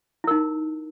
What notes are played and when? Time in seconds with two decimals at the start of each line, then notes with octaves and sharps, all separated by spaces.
0.24 E4
0.27 A#4
0.31 D#4